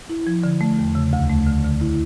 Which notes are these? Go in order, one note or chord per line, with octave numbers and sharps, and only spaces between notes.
E4
F3
D3
A3
E2
C#3
D2
A3
D3
D3
E4